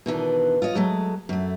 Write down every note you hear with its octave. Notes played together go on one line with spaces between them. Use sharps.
B2 D#3 E3 D4
F4 C#5 D#5
F#3 G#3 A3
F#2 A3